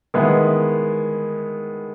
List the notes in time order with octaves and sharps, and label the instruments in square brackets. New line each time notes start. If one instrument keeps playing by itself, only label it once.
[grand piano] D#3 G#3 B3 E4